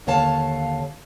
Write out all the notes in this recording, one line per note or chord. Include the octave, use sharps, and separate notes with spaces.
D#2 D3 C#5 F5 A5